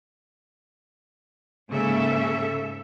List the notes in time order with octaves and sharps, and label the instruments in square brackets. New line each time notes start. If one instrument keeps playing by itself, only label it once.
[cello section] G#2 C#3 A#3 A4 E5